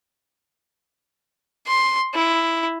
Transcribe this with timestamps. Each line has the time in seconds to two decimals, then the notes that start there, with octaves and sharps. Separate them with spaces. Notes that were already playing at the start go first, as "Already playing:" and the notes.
1.67 C6
2.14 E4